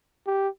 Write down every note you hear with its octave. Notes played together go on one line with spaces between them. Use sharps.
G4